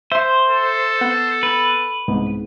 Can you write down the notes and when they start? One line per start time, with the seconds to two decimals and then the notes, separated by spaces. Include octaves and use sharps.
0.12 C5 E5 C6
0.47 A4
1.01 B3 F#5 A6
1.43 B4
2.08 C2 G#2 B3